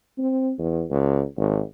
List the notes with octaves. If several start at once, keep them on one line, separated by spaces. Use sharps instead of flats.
C4
E2
C#2
G#1